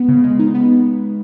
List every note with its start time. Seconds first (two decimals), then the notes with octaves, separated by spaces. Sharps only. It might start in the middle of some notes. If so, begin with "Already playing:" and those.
Already playing: B3
0.09 C#3
0.24 G#3
0.39 D#4
0.55 B3